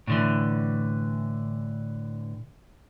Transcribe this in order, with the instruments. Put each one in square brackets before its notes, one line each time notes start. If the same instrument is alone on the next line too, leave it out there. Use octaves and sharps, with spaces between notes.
[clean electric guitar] A2 D3 E3